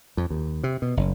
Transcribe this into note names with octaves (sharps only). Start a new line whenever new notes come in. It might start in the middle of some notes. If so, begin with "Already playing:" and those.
F2
D#2
C3
B2
F#1